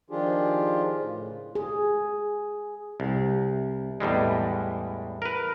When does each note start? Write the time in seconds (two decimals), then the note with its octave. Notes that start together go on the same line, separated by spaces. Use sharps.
0.10 D#3 F3 D4 F4 G4 G#4
0.98 A2 C#3
1.55 G#4
3.00 C2
4.00 E2 A2 G3 G#3
5.22 A#4 B4